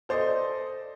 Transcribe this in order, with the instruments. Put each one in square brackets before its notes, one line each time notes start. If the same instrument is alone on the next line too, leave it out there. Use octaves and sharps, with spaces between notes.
[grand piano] A4 C5 D5 D#5